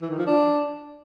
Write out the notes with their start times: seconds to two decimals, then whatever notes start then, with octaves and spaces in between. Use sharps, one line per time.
0.02 E3
0.10 D#3
0.18 F3
0.27 D4